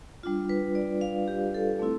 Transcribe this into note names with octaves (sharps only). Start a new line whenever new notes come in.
G3 D4 F4
B4
D5
F5
G4
A4
A3 C4 E4